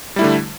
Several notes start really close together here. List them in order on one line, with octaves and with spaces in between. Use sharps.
G3 E4 A3 D3